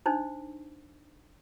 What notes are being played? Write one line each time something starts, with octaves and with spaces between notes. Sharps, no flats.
D4 D#4 C5